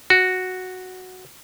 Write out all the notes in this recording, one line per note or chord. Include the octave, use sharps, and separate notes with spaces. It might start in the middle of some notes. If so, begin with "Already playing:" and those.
F#4